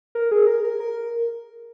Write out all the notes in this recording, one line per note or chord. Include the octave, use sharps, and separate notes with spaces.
A#4
G#4
A#4
A#4
A#4